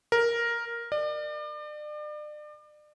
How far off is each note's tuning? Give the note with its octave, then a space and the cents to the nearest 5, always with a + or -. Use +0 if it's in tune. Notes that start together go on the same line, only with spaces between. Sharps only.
A#4 +5
D5 +35